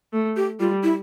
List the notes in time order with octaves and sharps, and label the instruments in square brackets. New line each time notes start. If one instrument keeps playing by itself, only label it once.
[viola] A3
[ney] G4
[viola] G3 [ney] F4
[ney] E4